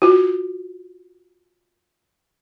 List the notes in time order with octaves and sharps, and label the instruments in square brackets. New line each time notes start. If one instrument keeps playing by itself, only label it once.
[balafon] F4 F#4